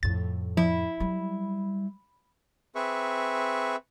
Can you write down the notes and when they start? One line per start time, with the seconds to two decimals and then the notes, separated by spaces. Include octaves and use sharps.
0.03 F2 A2 A6
0.57 F3 E4
1.00 F#3 G3
2.75 C4 G#4 B4 E5 C#6